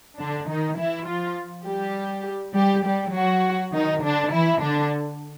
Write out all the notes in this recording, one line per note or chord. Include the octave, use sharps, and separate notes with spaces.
D3 D4
D#3 D#4
E3 E4
F3 F4
G3 G4
G3 G4
G3 G4
F#3 F#4
D#3 D#4
D3 D4
E3 E4
D3 D4